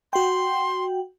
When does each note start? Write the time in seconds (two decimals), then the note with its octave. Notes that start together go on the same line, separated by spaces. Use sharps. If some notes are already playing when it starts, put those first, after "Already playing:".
0.13 F#4 G5 C6